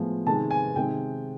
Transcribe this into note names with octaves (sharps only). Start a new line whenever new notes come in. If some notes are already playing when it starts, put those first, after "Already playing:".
Already playing: A2 F3 G#3 B3
C3 D#3 G#3 A5
G#5
C3 D#3 G#3 G5